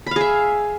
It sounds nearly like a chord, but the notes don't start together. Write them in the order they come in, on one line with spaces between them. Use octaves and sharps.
B5 F5 G#4 E5